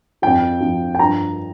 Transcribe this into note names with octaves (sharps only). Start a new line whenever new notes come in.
F2 F3 G5
F2 F3
G5
G2 F3 A#5